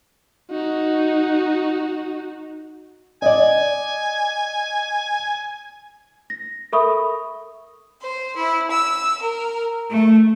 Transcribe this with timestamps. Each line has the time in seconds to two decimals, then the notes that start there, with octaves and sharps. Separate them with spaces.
0.51 D#4 F#4
3.22 D5 D#5 G#5
6.30 A#6
6.73 A4 A#4 E5 B5 C#6 D#6
8.01 C5
8.36 E4
8.70 E6
9.22 A#4
9.88 A3